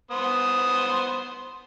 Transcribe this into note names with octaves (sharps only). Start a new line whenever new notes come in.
B3 C5 D#6